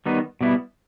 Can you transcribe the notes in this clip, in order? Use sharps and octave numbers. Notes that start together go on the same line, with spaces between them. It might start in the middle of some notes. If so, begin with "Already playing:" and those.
D#3 G3 B3 D#4
B2 G3 B3 E4